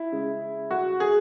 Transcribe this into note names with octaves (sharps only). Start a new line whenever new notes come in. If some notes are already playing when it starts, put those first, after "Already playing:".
Already playing: E4
C#3 G#3
F#4
G#4